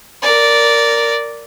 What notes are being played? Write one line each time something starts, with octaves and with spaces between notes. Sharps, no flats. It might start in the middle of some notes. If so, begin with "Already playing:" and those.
A#4 D5